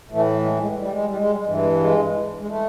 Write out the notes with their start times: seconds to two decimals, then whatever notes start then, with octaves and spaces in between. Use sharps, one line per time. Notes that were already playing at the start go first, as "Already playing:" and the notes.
0.11 A2 E3 A3
0.45 G#3
0.62 G#3
0.79 G3
0.92 G#3
1.05 G3
1.18 G#3
1.31 G3
1.46 G2 E3 G#3
1.63 G#3
1.80 G#3
2.39 G#3
2.48 A3